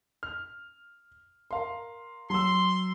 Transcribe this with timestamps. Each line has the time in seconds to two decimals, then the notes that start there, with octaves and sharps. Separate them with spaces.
0.23 F6
1.51 A#4 F5 C6
2.30 F#3 C6 E6